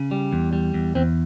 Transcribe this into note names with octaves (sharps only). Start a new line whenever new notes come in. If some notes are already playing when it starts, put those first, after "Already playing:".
Already playing: C#3
G3
E2
G3
E2
E2 C4